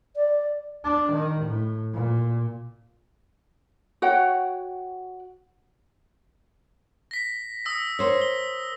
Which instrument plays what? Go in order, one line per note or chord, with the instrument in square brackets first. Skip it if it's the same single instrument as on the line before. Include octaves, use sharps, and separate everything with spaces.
[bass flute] D5
[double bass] D4
D#3
A2
A#2
[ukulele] F#4 C#5 F#5 G5
[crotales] A#6 B6
D#6 E6 A#6
[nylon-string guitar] A#4 C5 C#5
[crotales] G7